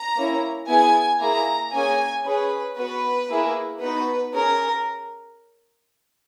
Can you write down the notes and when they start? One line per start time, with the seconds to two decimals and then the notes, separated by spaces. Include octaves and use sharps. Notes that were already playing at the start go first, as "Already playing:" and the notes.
Already playing: A#5
0.16 A#3 C#4 E4
0.68 B3 E4 G#4 G#5
1.20 A#3 E4 G#4 A#5
1.73 A#3 C#4 G#4 G#5
2.24 C#4 G#4 B4
2.76 B3 F#4 B4
3.28 A#3 E4 G#4
3.81 B3 D#4 F#4 B4
4.33 C#4 G#4 A#4